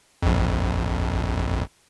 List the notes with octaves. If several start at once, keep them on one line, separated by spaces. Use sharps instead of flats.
A#1 F2